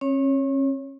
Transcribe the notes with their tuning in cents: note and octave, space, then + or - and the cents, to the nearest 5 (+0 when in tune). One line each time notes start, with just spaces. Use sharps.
C#4 -40 C#5 +0